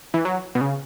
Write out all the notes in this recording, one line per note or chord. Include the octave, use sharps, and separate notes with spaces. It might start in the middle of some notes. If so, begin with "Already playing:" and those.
E3
F#3
B2
C#3